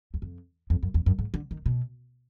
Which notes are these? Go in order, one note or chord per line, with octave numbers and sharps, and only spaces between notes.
E2
F2
F2
F#2
E2
F#2
G#2
D3
D#3
B2